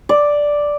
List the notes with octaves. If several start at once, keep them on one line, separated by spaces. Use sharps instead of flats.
D5